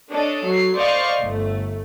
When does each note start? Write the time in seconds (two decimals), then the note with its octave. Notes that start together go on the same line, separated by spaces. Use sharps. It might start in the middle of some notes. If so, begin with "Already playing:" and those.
0.11 D4 A4 C#5 D#5
0.46 F#3 C7
0.77 C5 D5 D#5 F5 C#6
1.22 G1 A3